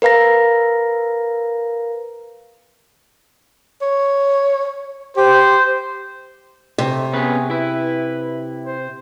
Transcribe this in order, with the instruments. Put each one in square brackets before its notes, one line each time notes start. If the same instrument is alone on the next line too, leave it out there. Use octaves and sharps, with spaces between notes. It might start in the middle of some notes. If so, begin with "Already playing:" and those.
[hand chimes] A#4 B4 F5 A#5 A#6
[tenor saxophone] C#5
[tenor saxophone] G4 [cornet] C5
[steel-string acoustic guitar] C3 [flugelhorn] A3
[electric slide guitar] B3 C#4 B4 [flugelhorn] G#4
[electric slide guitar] E4 E5 [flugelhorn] B4
[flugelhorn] C5